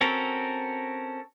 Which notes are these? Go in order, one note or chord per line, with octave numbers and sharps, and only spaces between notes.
C4 C#4 F#4 A4 A#4